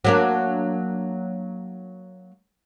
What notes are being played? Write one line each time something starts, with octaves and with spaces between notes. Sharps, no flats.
F#3 A#3 D4